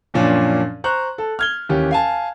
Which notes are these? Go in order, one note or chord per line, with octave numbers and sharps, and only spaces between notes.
F#2 A#2 F3 C#4 D4
C5 A#5 C#6 F#6
A4
F6 G#6 G7
D#2 E3 C#4 G4
F5 G#5 A5